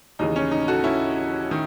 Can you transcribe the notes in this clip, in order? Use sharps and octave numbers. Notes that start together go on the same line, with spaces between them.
D#2 C#3 E3 D#4
C#4
D#4
F#4 A4
C#4 E4
D#3